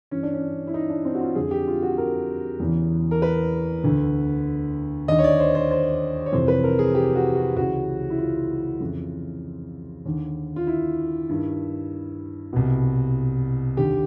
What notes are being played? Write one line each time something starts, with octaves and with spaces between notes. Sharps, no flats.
G2 E3 C#4
D4
C#4
E4
D#4
D4
C4
F#4
F4
F2 D3 G#4
G4
F4
F#4
A#4
E2 C#3 E3
A#4
B4
D2 D3
D#2 D3 D#5
C#5
D5
C5
C5
C5
C#5
F2 C3 E3 C5
B4
A#4
G#4
G4
F#4
F#4
C#2 C#3 E3 F#4
E4
F4
F2 C#3 E3
D#2 D3
F4
E4
G2 D#3
C2 B2
D#2 D3 G4